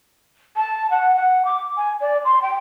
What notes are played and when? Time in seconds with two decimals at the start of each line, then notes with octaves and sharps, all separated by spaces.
0.56 A5
0.91 F#5
1.16 F#5
1.45 D6
1.77 G#5
2.01 D5
2.25 C6
2.42 G5